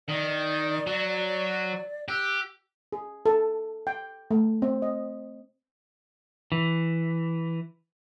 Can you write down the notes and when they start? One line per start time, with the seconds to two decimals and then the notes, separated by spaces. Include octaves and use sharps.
0.08 D#3 D5
0.87 F#3
2.08 G4 E6 F#6
2.92 G#4
3.26 A4
3.87 G5
4.31 A3
4.62 C4
4.82 D#5
6.52 E3